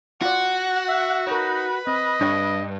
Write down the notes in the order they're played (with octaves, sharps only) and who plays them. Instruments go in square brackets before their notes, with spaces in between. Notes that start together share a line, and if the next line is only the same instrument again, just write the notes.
[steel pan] F4 D5 [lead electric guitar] F#4 [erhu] F#5
[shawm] E5
[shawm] D#4 [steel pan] A#4 C#5 [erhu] B4
[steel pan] C4 [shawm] D#5
[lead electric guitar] G2 [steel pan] D4 C#5 G5